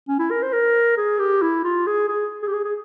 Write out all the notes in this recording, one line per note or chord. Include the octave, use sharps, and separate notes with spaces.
C#4
E4
A#4
C5
A#4
G#4
G4
E4
F4
G#4
G#4
G#4
G4
G#4
G#4